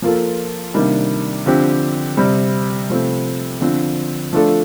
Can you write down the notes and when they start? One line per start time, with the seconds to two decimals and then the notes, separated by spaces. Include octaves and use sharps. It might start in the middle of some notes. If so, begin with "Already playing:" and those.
0.02 F3 A#3 F4 A4
0.74 C3 D#3 G3 A#3 D4
1.46 D3 F3 C4 G4
2.17 C3 G3 C4
2.90 C3 F3 A3 C4
3.61 D3 F3 C4
4.33 F3 A3 D4 F4 A4